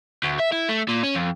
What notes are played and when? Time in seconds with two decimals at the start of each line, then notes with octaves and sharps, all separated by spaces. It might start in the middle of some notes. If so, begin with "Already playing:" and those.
0.23 D2
0.40 E5
0.53 E4
0.69 A3
0.88 A#2
1.03 C#4
1.15 F2